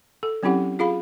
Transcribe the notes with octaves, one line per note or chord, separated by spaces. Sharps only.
A4
F#3 C4 C#4 E4 G4 F#5
F4 G#4 F5 B5